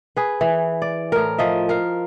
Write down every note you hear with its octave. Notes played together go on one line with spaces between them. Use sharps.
G#4 B4
E3
D5
A2 A#4
F3 D#5 E5
A#4 F5